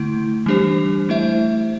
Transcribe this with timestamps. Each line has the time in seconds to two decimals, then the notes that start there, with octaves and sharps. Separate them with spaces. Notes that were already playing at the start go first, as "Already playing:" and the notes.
Already playing: D3 A3 E4
0.46 E3 G3 D4 G4 C5
1.09 A3 E4 C5 E5